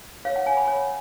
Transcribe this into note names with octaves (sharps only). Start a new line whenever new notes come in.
C#5 F5
F#5
C#5 G#5
B5
C#5